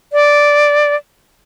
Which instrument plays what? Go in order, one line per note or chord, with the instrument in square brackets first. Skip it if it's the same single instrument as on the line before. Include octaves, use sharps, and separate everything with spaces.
[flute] D5